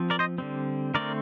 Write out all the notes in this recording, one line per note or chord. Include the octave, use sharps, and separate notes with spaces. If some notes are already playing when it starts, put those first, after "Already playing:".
Already playing: F3 C4
A#4 D5
C5 D#5
D3 G3 C4
D3 A3 C4 A#4 D5